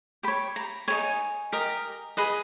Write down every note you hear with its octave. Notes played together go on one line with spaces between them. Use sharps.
G4 C#5 B5
A#5
D#4 A#4 C#5 G#5
G4 A#4 D#5
G#4 B4 D#5